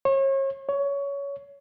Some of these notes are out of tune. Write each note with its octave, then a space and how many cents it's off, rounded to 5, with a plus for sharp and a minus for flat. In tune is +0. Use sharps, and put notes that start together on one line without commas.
C#5 -35
C#5 +20